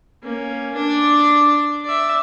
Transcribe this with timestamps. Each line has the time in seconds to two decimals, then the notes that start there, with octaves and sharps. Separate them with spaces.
0.23 A#3 C#4
0.75 D4 D5
1.84 D5 E5